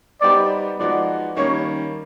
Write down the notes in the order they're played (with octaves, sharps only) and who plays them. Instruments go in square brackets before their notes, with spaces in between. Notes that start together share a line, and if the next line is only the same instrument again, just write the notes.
[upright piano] G3 B3 D#4 G4 C5 [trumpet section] D5
[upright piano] F3 G#3 B3 D#4 F#4 [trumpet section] D5
[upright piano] D#3 G3 A#3 C#4 [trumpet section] C#5